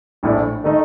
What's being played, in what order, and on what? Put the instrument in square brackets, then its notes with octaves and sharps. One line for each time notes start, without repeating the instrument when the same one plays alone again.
[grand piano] A#1 A2 A3 D4
D#3 A3 D#4